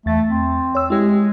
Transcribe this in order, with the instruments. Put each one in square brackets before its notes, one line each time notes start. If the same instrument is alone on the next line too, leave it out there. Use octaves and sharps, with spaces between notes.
[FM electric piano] E2 A6 [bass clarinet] A3
[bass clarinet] C4
[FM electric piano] C#5 E6
[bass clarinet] G#3 [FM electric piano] E4 G4